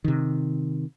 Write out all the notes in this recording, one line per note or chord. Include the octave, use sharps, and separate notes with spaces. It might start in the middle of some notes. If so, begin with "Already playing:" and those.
C3 D#3